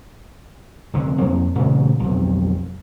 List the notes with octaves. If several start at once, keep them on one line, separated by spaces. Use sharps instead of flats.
F1 D3
F2 A#3
A#2 C#3 E3 A3
B1 F2